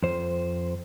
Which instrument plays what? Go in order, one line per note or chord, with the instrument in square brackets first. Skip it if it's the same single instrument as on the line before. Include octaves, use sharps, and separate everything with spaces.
[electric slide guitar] F2 C5